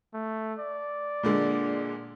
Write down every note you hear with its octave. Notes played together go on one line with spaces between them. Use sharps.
A3
D5
A#2 D3 G#3